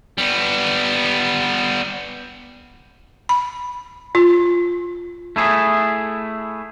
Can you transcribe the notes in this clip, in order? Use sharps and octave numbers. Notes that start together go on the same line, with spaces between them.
G3 B3
B5
F4
A3 E4 G#4